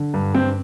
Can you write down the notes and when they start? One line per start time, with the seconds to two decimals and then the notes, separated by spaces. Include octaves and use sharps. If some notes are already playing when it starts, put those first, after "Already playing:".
Already playing: D3
0.14 G2
0.34 G2 C4